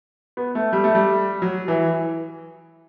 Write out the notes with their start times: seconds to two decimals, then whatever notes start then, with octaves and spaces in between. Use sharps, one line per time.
0.37 B3
0.55 A3
0.73 G3
0.84 A3
0.95 G3
1.42 F#3
1.68 E3